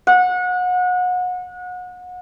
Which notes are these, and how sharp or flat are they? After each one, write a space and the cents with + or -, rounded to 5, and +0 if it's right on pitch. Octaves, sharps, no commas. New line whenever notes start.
F#5 -30